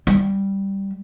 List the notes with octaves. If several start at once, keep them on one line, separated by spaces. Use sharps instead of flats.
G3